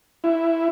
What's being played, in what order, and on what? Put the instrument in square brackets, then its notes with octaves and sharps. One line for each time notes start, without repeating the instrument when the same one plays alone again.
[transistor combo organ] E4